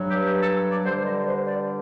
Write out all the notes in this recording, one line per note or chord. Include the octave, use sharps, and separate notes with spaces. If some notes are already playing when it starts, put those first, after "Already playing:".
Already playing: G2 F#3
G4
G4
A4
D5
G2 D3 G3 C5
D#5
D5
C5
D5